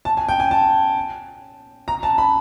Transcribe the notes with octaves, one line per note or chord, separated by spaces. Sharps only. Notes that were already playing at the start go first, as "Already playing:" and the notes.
A5
G#5
G5
G#5
A5
A#5
A5
B5